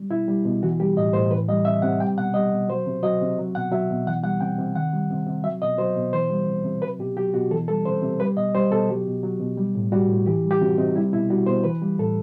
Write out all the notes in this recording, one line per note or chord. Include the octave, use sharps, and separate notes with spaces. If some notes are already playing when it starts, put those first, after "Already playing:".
Already playing: G3
B2 E4
G3
B2
E3 F#4
G3 G4
A2 D#5
A2 C5
E3 B4
G3 D#5
C3 E5
C3 F#5
G3 G5
B2 F#5
G3 D#5
B2
F#3 C5
C3
F#3 D#5
C3
F#3
B2 F#5
F#3 E5
B2
E3 F#5
G3 F#5
C3 G5
C3
D#3 F#5
G3
C3
C3
F#3 E5
B2 D#5
F#3 C5
B2
E3 C5
G3
C3
C3
F#3 B4
B2 G4
F#3 G4
B2 F#4
E3 A4
G3 A4
C3 C5
C3
G3 B4
B2 D#5
G3 C5
B2 A4
F#3 G4
B2
F#3
B2
G3
A2
G3 F#4
A2
E3 G4
G3
G4
C3 F#4
C3 D#4
G3 E4
B2 E4
G3 F#4
B2 C5
E3 B4
G3
A2 A4